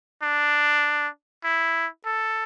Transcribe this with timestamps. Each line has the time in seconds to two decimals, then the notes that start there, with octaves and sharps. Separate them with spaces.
0.23 D4
1.44 E4
2.05 A4